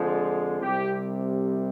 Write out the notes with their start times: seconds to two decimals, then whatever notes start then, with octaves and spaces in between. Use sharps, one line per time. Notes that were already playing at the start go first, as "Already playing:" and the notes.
Already playing: F2 D3 F3 G#3
0.61 C2 C3 G3 G4